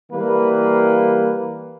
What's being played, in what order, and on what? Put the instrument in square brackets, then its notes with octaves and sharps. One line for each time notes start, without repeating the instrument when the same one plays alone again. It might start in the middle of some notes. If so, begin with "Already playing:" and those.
[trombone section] E3 G3 A#3 B4